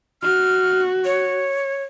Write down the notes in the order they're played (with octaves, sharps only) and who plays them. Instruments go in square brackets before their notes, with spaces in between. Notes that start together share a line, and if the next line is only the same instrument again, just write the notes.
[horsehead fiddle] F#4 [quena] F6
[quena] C#5